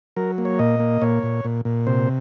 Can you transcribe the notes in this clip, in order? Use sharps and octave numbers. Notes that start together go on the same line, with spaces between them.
F#3 A#4
A#3
C#5
A#2 D#5
A#3
A#2 C#5
A#2
A#2
A#2
C3 C5